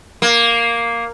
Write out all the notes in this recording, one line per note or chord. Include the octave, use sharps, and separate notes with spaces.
A#3